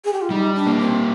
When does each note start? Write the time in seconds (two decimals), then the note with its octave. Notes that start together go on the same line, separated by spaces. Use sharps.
0.05 G#4
0.13 G4
0.21 F4
0.31 G3 D#4
0.55 D4
0.67 A#3
0.79 C4